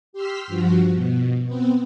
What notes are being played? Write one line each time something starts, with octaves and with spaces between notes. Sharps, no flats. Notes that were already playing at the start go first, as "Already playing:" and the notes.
G4 C6 E6 F6 B6
G2 F3 F#4
B2
B3 C4